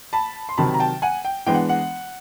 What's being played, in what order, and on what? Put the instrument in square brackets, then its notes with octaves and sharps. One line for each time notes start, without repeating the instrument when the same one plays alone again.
[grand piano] A5 B5
C6
C3 D#3 F#3 A5 B5
A#5
G5 A5
F#5 G#5
G5
E3 G#3 B3 D4 G5
F#5
F#5